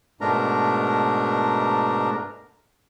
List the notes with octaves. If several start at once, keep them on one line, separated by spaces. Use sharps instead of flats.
G#2 B2 A3 D4 A#4 A#5